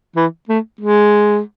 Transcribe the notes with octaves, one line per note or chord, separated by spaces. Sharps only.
E3
A3
G#3